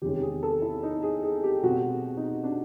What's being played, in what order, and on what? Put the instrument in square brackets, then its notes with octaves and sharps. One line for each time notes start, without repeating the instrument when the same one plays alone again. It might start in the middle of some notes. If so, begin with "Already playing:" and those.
[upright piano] E2 C3 D#3 G#3 C#4 G4
G4
G#4
A4
E4
D#4
G#4
G#4
G4
B2 G#3 C4 F#4
D#4
D4